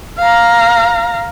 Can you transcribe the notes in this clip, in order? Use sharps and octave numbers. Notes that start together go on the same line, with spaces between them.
F5 A#5